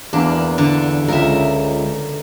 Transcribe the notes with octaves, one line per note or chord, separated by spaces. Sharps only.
E2 A#3 D4
D3
C#2 A#4 E5